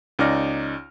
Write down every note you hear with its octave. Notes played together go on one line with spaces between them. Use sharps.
C#2 C#4 D#4 D5 F6 A#6